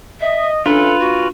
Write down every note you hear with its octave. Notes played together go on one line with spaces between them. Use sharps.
D#5 E5
E3 C#4 D4 F4 A4 B4
A#2 F#4